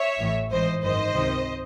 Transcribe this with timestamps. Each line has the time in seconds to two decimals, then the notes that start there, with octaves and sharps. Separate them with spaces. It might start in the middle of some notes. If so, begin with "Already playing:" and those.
Already playing: C#5 E5
0.19 A1 A2 E3
0.51 G#1 G#2 E3 C5 D#5
0.82 G#1 F#2 D#3 C5 D#5
1.14 C#2 C3 D#3